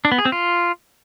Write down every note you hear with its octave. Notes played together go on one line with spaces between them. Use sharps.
D4
B3
G#4
C4
F4